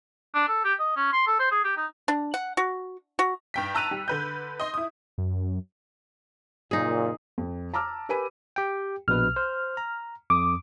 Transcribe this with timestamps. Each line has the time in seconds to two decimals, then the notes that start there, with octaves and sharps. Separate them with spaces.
0.35 D4
0.48 A4
0.64 G4
0.80 D#5
0.96 C#4
1.13 C6
1.27 A4
1.40 C5
1.52 G#4
1.64 G4
1.77 D#4
2.08 D4
2.34 F#5
2.57 F#4
3.19 F#4
3.54 G2 G5 B6
3.75 A5 A#5 E6 F#6 D#7 F7
3.91 G3
4.08 D3 B4 G6
4.60 D#5 C6
4.74 E4 D#6
5.18 F#2
6.71 F#1 A#2 D#4 G#4
7.38 F2
7.74 A5 A#5 D6 E6 F6
8.09 G4 A#4 B4 G#5 B5 D#7
8.56 G4 G5
9.08 A#1 B2 B4 F6
9.36 C5
9.77 A#5
10.30 F2 D6 D#6